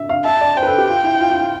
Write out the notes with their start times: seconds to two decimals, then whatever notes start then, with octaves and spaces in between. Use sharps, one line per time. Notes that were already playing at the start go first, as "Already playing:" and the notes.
Already playing: E5
0.09 F5
0.25 E5 A5
0.41 D5
0.57 C5 G5
0.63 B4
0.67 A4
0.78 G4
0.89 F4
1.04 E4
1.20 F4
1.30 F4
1.41 F4